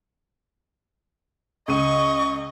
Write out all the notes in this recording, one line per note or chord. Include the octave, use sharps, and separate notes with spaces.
C#2 D#5 C#6 D#7